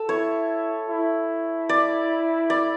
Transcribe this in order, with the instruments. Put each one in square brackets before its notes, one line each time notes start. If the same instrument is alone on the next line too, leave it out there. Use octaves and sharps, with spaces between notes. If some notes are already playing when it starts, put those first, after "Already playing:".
Already playing: [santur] A4
[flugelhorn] E4 [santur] C#5
[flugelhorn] E4
[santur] D5
D5